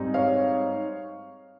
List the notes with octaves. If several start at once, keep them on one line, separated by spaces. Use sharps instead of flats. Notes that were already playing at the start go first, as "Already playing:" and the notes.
Already playing: G#2 G3 C4 D#4
C#5 F5